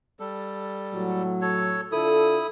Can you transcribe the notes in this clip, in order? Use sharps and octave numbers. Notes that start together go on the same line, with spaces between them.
G3 A4
A2 F#3
A4 C#5
D3 E4 F4 A4 D#6